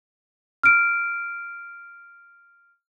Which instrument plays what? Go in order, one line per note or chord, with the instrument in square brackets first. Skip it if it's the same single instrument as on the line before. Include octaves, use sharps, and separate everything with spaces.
[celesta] F6 D7